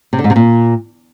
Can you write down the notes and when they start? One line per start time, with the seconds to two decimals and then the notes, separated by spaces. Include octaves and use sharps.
0.13 C3
0.18 D3
0.24 G#2
0.30 C3
0.36 A#2